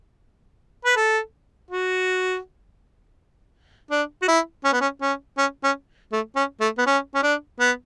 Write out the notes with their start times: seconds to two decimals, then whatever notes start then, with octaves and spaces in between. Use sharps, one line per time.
0.85 B4
0.96 A4
1.71 F#4
3.91 D4
4.22 F#4
4.28 E4
4.64 C#4
4.73 B3
4.81 C#4
5.01 C#4
5.38 C#4
5.63 C#4
6.12 A3
6.36 C#4
6.60 A3
6.78 B3
6.86 C#4
7.15 C#4
7.23 D4
7.60 B3